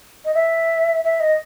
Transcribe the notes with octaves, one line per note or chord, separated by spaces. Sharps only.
D#5
E5
E5
D#5